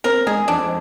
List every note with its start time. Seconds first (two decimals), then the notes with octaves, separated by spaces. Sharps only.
0.04 C4 A#4
0.27 G#3 G#4
0.48 F2 D4